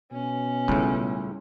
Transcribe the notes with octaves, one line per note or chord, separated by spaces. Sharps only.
B2 C#4
C#2 A2 G3 D4